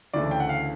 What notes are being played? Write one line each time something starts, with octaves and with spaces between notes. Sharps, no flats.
D2 C#3 E3 A3 D5
G5
F#5
F5